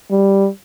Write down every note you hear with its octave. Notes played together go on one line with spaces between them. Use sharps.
G3